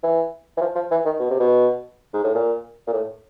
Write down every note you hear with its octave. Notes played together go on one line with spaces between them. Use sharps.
E3
E3
F3
F3
E3
D#3
B2
C3
B2
G#2
A2
A#2
A#2
A2